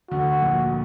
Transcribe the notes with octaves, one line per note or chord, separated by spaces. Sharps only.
D2 D3 F#4
A#1 A#2